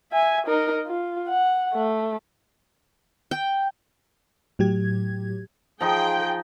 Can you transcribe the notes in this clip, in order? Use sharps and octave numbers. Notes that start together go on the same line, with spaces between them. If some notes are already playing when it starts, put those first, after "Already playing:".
E5 G#5
D#4 A#4
F4
F#5
A3
G5
A2 F#3 G4 G#6
F3 D#4 G#4 G5